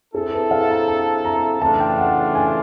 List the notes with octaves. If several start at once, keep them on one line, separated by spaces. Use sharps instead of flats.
C4 E4 G#4 A4
B4
F5
A#5
A5
A#5
C#3 E3 A3 D4 F4 A5
G5
F#5
G#5